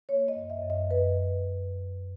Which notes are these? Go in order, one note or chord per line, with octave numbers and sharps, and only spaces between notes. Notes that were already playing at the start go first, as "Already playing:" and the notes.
A#3 C#5
D#5
F#2
E5
F#2
D#5
F#2 B4